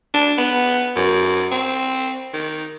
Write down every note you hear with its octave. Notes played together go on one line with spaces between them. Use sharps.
D4
B3
F#2
C4
D#3